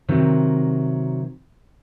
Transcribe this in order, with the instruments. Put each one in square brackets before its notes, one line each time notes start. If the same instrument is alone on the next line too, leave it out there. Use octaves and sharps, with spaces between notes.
[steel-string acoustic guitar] C3 D#3 F#3